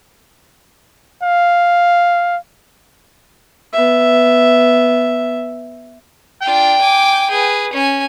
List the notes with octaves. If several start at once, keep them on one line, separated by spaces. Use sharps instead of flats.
F5
B3 E5
D4 F4 G5
G#5 D6
G#4 B4
C#4 G#5